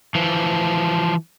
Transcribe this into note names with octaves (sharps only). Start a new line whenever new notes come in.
E3 F3